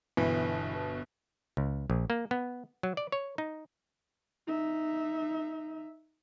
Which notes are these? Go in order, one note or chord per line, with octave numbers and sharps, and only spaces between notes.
G1 B2 E3
C#2
A#1
A#3
B3
F#3
D5
C#5
D#4
D#4 E5